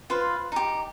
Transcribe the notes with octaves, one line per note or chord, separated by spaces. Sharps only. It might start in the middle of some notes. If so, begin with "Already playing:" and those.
F4 B4 C5 F5
D#4 G4